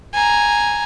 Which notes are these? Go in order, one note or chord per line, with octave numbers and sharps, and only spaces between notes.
G#5 A#5